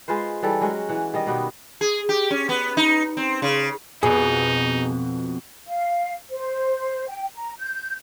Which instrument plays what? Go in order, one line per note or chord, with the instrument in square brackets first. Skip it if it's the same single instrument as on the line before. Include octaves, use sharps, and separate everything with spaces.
[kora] G#3 F4 B4 C5
E3 G3 A4
F#3 G#3 C#4 F#4
E3 F#5
D#3 G3 D#5
B2 B3 G4
[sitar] G#4
G4
C#4
B3
D#4
C4
C#3
[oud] F2 B2 [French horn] D#4 [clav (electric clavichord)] G#4
[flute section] F5
C5
G5
A#5
G6